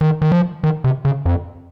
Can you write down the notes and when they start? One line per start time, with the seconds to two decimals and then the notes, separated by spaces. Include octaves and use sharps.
0.01 D#3
0.22 D#3
0.32 F3
0.64 D#3
0.84 C3
1.05 C#3
1.26 F2